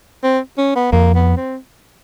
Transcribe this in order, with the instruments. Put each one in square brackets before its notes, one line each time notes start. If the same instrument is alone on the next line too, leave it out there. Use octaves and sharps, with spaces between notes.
[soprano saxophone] C4
C#4
B3
[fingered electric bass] F2 [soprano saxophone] A#3
[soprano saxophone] B3
C4